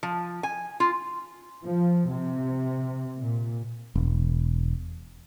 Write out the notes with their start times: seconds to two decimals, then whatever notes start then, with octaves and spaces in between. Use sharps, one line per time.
0.03 F3
0.43 G#5
0.80 F4
1.65 F3
2.10 C3
3.18 A#2
3.95 E1